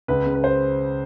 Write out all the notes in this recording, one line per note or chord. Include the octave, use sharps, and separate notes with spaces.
C#2 B4
C#3
B4
C5